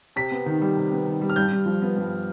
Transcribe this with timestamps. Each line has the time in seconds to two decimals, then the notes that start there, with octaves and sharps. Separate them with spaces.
0.16 C3 B6
0.31 B3
0.46 D#3
0.61 G3
0.77 C3
0.92 B3
1.07 D#3
1.21 G3
1.30 F6
1.36 G2 G6
1.51 G2
1.66 F3
1.82 B3
1.97 G2